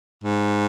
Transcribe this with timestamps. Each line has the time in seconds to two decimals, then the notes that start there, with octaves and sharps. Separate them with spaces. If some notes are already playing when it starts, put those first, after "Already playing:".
0.24 G#2